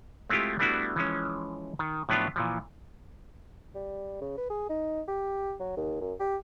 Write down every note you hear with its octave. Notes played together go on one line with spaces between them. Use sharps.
G#3 A3 C4 E4 F4 G4
G3 A3 B3 D4 E4 F#4
E3 F3 G#3 C#4
D#3
A2 F3 F#3 B3 D4 F4
A#2 E3 F3
G3
C#3
B4
G#4
D#4
G4
F#3
D#2
F#2
G4